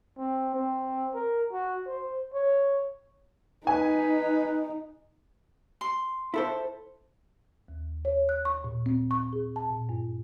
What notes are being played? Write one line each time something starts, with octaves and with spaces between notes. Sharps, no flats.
C4
C4
A#4
F#4
C5
C#5
D#4 B4 G#5
C6
E4 A4 C5
D#2
C#5
F#6
C#6
A#2
C4
C#6
G#4
A5
A#2
G2